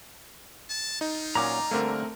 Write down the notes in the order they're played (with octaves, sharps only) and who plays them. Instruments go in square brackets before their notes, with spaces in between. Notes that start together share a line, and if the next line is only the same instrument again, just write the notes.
[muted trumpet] A5
[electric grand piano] D#4 [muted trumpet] F4
[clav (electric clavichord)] A#2 F#3 C#4 [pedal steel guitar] A#5 D6
[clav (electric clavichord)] D3 G3 A#3 [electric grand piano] A3 C4 A#4